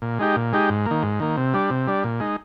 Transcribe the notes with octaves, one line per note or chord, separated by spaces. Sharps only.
A#2
G#3 D#4 G4
A#2
G#3 D#4 G4
G#2
D#3 A#3
G#2
D#3 A#3
C3
G3 D4
C3
G3 D4
A#2
G#3 D#4